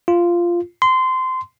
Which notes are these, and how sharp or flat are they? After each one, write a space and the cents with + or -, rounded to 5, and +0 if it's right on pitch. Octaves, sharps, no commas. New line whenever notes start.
F4 -10
C6 -20